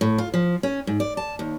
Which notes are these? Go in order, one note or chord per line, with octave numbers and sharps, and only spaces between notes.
A2
F4
F3
C#4
G#2
D5
A5
D#2